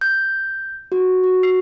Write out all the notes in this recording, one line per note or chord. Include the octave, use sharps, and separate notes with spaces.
G6
F#4
F#4
C7